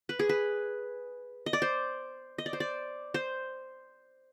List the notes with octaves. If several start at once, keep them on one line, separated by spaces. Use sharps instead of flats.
B4
G#4
B4
D#5
D5
C5
D#5
D5
C5
D5
C5